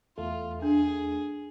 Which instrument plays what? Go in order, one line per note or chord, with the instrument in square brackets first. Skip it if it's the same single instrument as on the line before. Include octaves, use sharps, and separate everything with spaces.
[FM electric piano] E2 A3 [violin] F4
[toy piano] D4 [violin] G#4